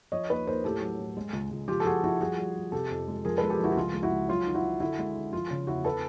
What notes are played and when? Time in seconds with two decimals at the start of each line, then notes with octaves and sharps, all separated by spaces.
0.12 F3 C#5 D#5
0.30 D#2 B4 C#5
0.47 D#2 A#4 C5
0.64 A2 G4 A4
0.81 F#3
0.99 A2
1.17 G#3
1.33 C#2
1.51 C#2
1.68 F3 F4 G4
1.80 A4
1.85 F3 F#4 G#4
2.03 F3 E4 F#4
2.20 G3 F#4 G#4
2.38 G3
2.56 G3
2.72 C3 G4 A4
2.91 F2
3.08 G#3
3.25 F3 G#4 A#4
3.38 G#3 A4 B4
3.50 G4 A4
3.59 F3 E4 F#4
3.72 F#4
3.77 C#2 F4
3.94 C#2
4.03 E4 F#4
4.12 C#2
4.28 F#3 F4
4.46 D#3
4.54 E4 F#4
4.64 D#3
4.80 D3 E4 F#4
4.99 G#3
5.15 D3
5.33 F3 F4
5.51 C#3
5.67 E2 E4 F#4
5.85 A4 B4